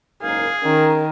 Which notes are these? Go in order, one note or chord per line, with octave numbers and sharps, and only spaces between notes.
F#1 G#2 G#4 A#4 F5
D#3 C#4 A#4